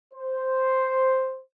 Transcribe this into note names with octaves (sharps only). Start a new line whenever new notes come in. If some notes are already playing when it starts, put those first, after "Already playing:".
C5